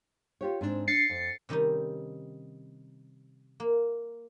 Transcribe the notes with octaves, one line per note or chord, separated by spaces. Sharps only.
F4 G4 C#5
G#2 C4 D4
D4 A6 C7 C#7
F2
C3 D#3 G3 C#4 D#4
A#3